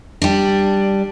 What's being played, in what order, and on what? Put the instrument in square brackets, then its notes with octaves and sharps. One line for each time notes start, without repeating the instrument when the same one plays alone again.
[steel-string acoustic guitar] G3 D4